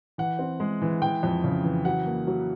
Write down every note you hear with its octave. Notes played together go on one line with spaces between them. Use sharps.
E3 F#5
C4
G#3
E3
E3 G5
F2
C#3
E3
F#3 F#5
A#3
F#3